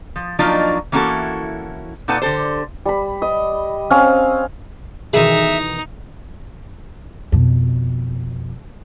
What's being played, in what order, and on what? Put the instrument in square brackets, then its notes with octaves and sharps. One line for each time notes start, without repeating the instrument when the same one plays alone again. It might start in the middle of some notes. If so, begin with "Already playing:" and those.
[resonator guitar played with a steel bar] F3
F3 F#3 A#3 D4 D#4 F4
E3 A#3 C#4 E4 F#4 A4
A#2 D#4 A4 B4 F#5 A5
D3 G4 A4 C5
[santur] G3 B5
D#5
C4 C#4 F5 D#6
[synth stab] B2 D#3 E3 [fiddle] D#4 [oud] G#4 [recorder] E5
[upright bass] F2 B2